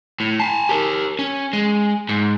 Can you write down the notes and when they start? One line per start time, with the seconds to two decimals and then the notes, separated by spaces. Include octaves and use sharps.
0.20 A2
0.40 G#5 A5
0.69 G4 A#4
1.19 C#4
1.53 G#3
2.09 G#2